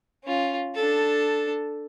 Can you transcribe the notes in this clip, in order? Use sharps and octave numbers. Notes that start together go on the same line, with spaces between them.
C#4 F4
D4 A4